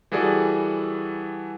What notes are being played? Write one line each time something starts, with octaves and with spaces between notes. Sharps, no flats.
E3 G3 F#4 G#4 A4 D5